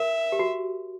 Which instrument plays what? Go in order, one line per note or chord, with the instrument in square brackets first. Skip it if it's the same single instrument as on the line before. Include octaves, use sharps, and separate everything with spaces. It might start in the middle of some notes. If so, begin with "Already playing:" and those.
Already playing: [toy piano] A#4 [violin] E5
[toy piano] G4
F#4